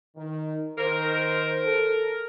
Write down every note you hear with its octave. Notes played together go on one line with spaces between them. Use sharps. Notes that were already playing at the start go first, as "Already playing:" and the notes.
D#3
D#3 A#4 C5
A4